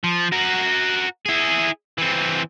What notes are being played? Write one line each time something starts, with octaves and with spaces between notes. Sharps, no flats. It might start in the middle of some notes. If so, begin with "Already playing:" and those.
F3
F#4 A#4
E4 G#4
E3 C4